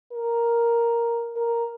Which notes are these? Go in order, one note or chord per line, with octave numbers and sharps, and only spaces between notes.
A#4
A#4